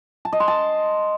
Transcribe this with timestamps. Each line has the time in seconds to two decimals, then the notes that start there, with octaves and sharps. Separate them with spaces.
0.25 A5
0.33 D#5
0.40 C6
0.48 A5